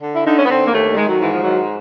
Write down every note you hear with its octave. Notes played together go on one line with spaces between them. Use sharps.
D3
E4
D3 D#4
C#4
B3
D3 C4
A#3
D#2 A3
G3
D#3 G#3
F#3
G#2 E3
F3
D#3 F#3